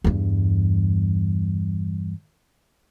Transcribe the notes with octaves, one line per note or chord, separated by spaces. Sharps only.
E2 G2